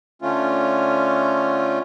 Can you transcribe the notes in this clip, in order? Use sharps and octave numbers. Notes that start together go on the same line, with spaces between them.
D3 A3 C#4 F4